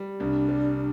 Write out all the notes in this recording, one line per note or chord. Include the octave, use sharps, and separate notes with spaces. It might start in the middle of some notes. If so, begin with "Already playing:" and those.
Already playing: G3
C2 D4
G3